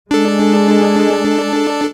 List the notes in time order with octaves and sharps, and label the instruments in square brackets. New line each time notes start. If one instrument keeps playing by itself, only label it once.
[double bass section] G#3 [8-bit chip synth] D4 A4